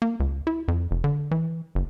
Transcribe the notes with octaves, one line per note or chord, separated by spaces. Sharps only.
A#3
C#2
E4
F2
F1
D3
E3
F#1